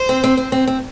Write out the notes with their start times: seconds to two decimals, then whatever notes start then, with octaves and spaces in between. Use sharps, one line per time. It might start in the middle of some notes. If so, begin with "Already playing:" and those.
Already playing: C5
0.09 C4
0.24 C4
0.37 C4
0.52 C4
0.67 C4